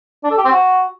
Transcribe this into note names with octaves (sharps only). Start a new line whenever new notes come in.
D4
A4
G4
C4
F#4